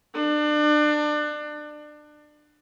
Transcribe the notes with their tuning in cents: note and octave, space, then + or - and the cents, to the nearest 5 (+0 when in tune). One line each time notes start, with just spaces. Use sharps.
D4 +30